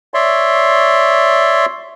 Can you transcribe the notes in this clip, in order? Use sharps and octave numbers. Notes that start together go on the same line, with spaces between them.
C#5 D5 E5 C6